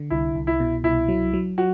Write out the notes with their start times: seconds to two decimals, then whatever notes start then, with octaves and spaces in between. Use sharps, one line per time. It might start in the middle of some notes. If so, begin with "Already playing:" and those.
Already playing: D3
0.10 C2 E4
0.35 C2
0.47 E4
0.60 B2
0.84 C2 E4
1.08 F#3
1.34 F#3
1.58 F#3 F#4